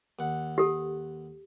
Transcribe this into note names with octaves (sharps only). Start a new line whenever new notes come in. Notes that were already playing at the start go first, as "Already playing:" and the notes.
D#2 F#5
G4 A4